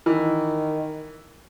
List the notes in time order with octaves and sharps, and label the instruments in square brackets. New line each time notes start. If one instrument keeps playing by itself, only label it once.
[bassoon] D#3 [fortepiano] E3